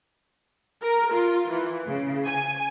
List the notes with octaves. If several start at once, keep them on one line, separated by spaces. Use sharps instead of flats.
A#4
F4
E3
C#3
G#5